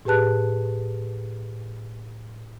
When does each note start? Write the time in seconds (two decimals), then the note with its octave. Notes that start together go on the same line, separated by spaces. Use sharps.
0.05 A2 G4 G#4 B4 A5 F#6